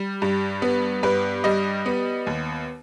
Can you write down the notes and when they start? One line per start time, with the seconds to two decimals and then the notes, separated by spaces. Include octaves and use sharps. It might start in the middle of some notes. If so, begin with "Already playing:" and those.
Already playing: G3
0.22 G2
0.62 B3
1.03 G2 B4
1.44 G3 D#5
1.86 B3
2.27 D#2